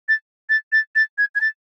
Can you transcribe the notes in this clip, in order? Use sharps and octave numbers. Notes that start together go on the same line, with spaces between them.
A6
A6
A6
A6
G#6
G#6
A6